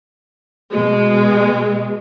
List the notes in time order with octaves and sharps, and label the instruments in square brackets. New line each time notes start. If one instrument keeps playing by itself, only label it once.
[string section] B2 G#3